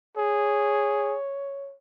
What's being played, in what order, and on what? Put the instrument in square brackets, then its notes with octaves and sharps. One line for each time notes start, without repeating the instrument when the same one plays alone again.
[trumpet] G#4 [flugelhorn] C#5